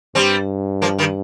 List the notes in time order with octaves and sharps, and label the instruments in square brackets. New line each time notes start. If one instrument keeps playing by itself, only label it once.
[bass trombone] G2 [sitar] G3 C4
[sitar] F3 A#3
D#3 G3